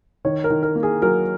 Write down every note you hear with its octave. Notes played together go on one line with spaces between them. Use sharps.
D#3 C#5
A#4
D#3
A#4
A#3
G#4
F#3 A#4